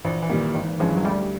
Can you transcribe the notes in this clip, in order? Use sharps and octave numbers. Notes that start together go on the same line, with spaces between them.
A#1 E3
E3
A#2 D#3 G3 A#3
G#1 D#3
G2 E3 F3 G#3 C#4
F#3
D2 G3